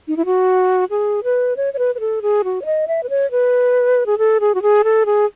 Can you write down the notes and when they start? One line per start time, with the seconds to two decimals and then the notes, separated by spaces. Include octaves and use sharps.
0.08 D#4
0.17 E4
0.26 F#4
0.91 G#4
1.24 B4
1.57 C#5
1.74 C#5
1.79 B4
1.95 B4
2.00 A4
2.22 G#4
2.44 F#4
2.62 C#5
2.66 D#5
2.88 E5
3.03 B4
3.10 C#5
3.31 B4
4.06 G#4
4.18 A4
4.40 G#4
4.55 F#4
4.62 G#4
4.84 A4
5.06 G#4